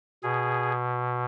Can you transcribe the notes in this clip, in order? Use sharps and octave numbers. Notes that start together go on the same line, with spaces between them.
B2 G#4